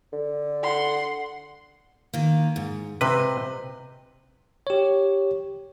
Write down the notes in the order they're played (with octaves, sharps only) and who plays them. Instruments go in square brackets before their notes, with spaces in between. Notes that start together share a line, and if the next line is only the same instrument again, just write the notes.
[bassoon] D3
[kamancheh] F#5 C6
[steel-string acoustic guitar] D#3 A#3
G#2
[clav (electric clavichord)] C3 B4 [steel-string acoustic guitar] C5 D#5
[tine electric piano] G4 C#5